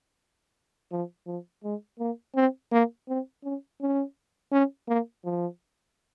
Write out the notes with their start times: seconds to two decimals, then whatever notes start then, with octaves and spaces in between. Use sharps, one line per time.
0.92 F3
1.27 F3
1.64 G#3
1.99 A#3
2.36 C4
2.72 A#3
3.08 C4
3.44 C#4
3.81 C#4
4.52 C#4
4.88 A#3
5.25 F3